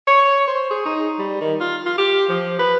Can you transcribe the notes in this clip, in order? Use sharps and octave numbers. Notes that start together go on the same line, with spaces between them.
C#5
C5
G#4
D#4
G3
D#3
F4
F4
G4
F3
B4